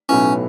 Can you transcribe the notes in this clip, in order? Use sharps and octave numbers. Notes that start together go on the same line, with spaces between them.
B1 A2 F#3 B3 C#4 E4